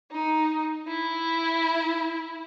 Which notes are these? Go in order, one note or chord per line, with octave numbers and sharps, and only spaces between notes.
D#4
E4